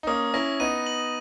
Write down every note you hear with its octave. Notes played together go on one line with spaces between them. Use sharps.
D#4
A#3 C#4 D#6
C#4 E4 A#6
B3 D#4 D#7
F#7